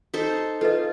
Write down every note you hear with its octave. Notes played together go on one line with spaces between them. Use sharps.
D#4 A4 C5
F4 A4 B4 D#5